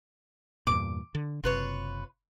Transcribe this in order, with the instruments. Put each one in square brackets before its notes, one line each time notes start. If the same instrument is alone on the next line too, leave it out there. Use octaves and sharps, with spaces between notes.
[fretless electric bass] E2 G2 A#2 [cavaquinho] D6
[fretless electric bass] D3
[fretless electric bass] F#1 C3 [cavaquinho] F4 B4 C#5